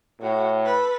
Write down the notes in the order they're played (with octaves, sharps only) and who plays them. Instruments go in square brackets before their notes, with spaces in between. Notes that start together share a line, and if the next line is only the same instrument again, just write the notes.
[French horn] A2 [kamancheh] F#4
[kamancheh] A4 B4